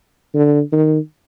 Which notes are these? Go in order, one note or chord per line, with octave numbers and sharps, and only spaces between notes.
D3
D#3